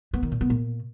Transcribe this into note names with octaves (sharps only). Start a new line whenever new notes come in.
B3
D#3
A#2
B3
A#2